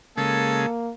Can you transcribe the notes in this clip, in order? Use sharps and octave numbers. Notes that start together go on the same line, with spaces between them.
C#3 G#3 A#3 A4